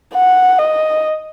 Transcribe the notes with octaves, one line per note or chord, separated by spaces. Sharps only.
F#5
D#5